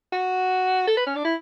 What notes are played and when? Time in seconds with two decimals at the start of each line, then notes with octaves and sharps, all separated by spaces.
0.12 F#4
0.87 A4
0.97 B4
1.06 C#4
1.15 D4
1.25 E4